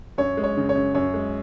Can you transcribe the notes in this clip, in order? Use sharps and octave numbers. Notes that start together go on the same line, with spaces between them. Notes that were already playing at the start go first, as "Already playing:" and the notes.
F#2 C#5
G#3
C#5
C#3
C#5
F#2
F#2 C#5
G#3